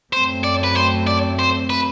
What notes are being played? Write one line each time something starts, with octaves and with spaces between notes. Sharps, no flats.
F#2 F#3 A3 C4 C5
D5
B4
C5
D5
C5
B4